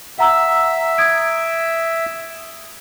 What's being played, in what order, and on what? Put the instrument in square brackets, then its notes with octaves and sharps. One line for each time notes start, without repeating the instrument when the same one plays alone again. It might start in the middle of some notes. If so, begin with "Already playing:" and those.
[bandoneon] E5 [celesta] F#5 A#5 E6
[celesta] D#6 G#6 D7